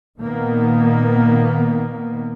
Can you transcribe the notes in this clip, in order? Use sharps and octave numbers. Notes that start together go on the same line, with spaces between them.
A#2 D#3 A#3 B3